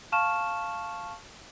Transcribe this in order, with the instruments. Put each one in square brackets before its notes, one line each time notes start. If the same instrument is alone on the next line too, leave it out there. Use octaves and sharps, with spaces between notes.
[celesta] F5 A5 C#6 F6 E7